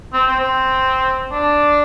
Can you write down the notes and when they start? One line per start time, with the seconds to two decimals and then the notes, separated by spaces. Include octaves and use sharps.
0.13 C4
0.27 C4
0.39 C4
1.32 D4